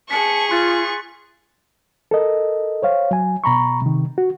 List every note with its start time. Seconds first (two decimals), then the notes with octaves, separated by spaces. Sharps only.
0.11 G#4 A5 C#6 B6 C#7 F#7
0.51 F4 C6 F#6 A6
2.11 A4 A#4 D#5
2.82 C5 C#5 F5
3.11 F#3 G#5
3.44 B2 A#5 B5 C#6
3.82 C3 D#3
4.18 F#4